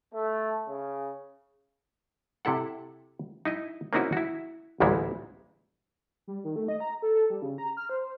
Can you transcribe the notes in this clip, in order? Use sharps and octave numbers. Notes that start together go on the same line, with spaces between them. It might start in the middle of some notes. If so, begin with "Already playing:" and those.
A3
C#3
C3 E4 A4 F#5
D#4 E4 D#5
A#3 C4 C#4 D#4 E4 F#4
E4 F#4
A1 D2 A#2 G3 G#3 E4
G3
D#3
A3
D#5
A#5
A4
A4
G3
C#3
A#5
F6
C5